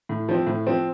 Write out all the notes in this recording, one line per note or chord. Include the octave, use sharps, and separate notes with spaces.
A2
F3 C4
A2
F3 C4